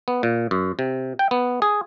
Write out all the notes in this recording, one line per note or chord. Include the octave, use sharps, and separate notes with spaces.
B3
A#2
F#2
C3
G5
B3
G#4